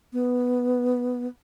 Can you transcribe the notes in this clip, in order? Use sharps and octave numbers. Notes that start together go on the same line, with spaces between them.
B3